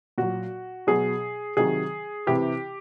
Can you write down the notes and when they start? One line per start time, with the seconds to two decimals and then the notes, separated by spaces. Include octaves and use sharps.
0.18 A#2 F#3 F#4
0.87 B2 F#3 G#4
1.57 C3 D#3 F#3 G#4
2.27 C3 E3 G4